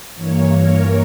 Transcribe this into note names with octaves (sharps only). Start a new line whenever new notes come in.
G2 E3 A#3 C#5
A#4